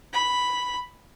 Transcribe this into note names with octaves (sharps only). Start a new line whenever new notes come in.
B5